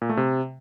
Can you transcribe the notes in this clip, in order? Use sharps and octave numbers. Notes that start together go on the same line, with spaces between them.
A#2
A3
C3